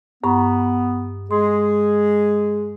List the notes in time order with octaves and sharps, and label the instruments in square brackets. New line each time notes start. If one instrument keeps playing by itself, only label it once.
[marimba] G2 A#5 C#6 [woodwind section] B3
[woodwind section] G#3 G#4 [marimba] C6